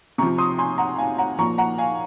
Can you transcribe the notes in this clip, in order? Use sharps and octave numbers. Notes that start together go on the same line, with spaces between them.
C3 F3 A#5 C#6
C6 D#6
G#5 C6
F#5 A#5
F5 G#5
F#5 A#5
A#2 F3 A#5 C#6
F#5 A#5
F5 G#5